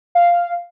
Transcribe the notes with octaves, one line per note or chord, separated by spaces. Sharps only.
F5